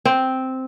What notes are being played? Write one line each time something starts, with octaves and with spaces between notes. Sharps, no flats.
C4